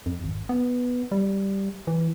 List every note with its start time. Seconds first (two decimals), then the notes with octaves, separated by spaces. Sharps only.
0.06 F2
0.24 G#1
0.49 B3
1.12 G3
1.87 E3